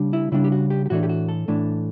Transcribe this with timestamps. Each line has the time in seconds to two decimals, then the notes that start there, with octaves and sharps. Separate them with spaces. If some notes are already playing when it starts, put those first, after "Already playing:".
Already playing: C#3 G3 D4
0.13 E4
0.32 C#3 G3 D4 E4
0.44 G4
0.52 F#4
0.70 G4
0.86 G4
0.90 A2 E3 A3 D4 F#4
1.03 G4
1.09 F#4
1.29 A4
1.48 A2 E3 A3 D4